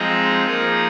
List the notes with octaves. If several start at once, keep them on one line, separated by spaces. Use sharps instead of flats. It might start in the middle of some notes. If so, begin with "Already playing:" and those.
Already playing: F3 G#3 C4 D#4 G#4
F3 A#3 D#4 G#4 D#5